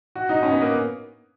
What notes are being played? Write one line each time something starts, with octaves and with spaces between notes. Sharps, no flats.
F#4
D#4
C#4
B3
A#3